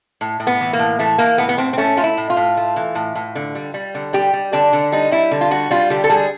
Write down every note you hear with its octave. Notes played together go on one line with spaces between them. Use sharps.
A2
A2
B3
E3
A#3
A2
E3 A3
E3 A#3
A2 B3
B3
A2 C4
C4
A3 C#4
A3 F4
E4
A2
F4
A2
A3
E3
A2
A2
D3
G3
G3
D3
G3 G4
G3
D3 D4
D3
G3 D#4
G3 E4
D3
F4
G3 F#4
G3 F4
D3 G4
A4
G3 G#4